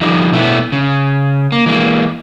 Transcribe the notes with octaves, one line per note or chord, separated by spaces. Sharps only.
D3 F3 G3 D#4
B2 A3 B3 E4
C#3
A#3
E3 G#3 A#3